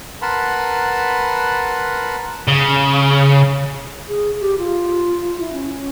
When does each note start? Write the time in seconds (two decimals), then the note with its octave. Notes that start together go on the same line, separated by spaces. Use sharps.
0.22 A#4 B4 F#5 A5 B5 C6
2.48 C#3
4.08 G#4
4.41 G4
4.58 F4
5.40 E4
5.53 C#4